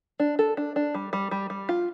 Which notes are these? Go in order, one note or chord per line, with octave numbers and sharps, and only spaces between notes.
D4
A4
D4
D4
G3
G3
G3
G3
F4